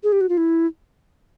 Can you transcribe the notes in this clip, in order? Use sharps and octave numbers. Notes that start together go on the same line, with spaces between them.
G#4
G4
F#4
F4
E4